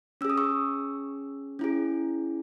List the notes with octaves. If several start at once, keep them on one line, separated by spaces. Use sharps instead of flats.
C#4 G#4 E6
D#6
C#6 E6
C#4 E4 G#4